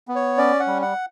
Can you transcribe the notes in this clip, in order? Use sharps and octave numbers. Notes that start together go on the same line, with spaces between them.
B3
C#5
C#4 D5
F#5
G3
F#5